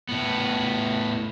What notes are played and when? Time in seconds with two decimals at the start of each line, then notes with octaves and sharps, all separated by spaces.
0.09 A2 B3